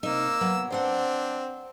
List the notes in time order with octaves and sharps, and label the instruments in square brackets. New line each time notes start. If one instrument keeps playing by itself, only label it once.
[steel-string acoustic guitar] C3 D#4 [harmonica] A#3 E6
[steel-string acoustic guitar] F#3 B3
[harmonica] C4 D4 [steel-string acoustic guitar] C5 D5 F#5